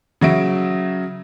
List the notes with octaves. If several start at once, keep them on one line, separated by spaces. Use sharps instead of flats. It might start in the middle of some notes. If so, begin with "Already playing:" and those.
C#3 F#3 E5 D7